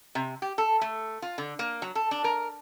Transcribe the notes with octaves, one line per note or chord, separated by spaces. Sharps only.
C3
G4
A4
A3
F4
D3
A#3
F#3
A4
D4
A#4